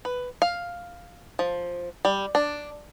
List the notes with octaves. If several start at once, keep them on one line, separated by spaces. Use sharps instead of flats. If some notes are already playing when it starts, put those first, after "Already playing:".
B4
F5
F3
G3
D4